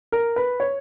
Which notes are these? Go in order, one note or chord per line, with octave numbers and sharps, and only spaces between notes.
A#4
B4
C#5